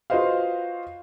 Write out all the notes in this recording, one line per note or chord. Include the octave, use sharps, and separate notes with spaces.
F4 F#4 B4 C5 D#5 F5